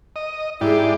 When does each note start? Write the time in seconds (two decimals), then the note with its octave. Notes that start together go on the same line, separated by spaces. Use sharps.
0.16 D#5
0.61 G#2 E4 G4 G#4 D5